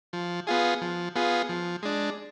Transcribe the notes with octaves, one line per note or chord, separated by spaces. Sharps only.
F3
B3 F4 G#4
F3
B3 F4 G#4
F3
G#3 D4